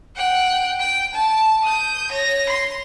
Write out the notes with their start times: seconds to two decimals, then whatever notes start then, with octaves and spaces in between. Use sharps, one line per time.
0.16 F#5 G5
0.80 G5
1.15 A5
1.64 D#6 G6
2.12 C#5 A#6
2.50 C6